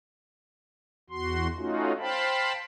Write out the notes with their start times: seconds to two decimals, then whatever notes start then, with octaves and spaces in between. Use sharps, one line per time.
1.10 E2 F#4 C6
1.57 A3 C#4 D#4 F4 F#4
1.99 C5 F5 G5 A5 B5